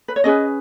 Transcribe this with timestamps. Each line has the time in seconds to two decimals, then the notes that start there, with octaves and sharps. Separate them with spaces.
0.08 B4
0.16 C#5
0.24 C#4 G#4 B4 D#5